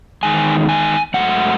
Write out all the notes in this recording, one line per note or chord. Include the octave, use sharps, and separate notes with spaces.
E2 D#3 G#3 G#5
G#5
G#2 F#3 A3 F#5